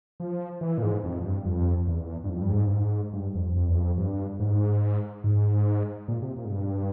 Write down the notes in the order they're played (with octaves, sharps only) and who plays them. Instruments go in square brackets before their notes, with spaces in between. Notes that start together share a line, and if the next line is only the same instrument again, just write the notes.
[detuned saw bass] F3
E3
A#2
G#2
F2
G2
F2
E2
G2
F2
G2
G#2
G2
G#2
G2
F2
F2
E2
F2
G2
G#2
G#2
A#2
C3
A#2
G#2
G2